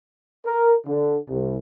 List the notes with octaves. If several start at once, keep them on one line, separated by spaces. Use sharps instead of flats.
A#4
D3
C2